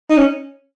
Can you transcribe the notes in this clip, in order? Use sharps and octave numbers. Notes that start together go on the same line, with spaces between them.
D#4
C#4